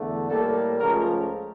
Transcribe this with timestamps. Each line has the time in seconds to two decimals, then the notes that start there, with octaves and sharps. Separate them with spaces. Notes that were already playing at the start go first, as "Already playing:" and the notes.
Already playing: E2 D3 A3
0.30 A2 G3 A#3 A4
0.80 C#2 C#3 F3 A3 A#4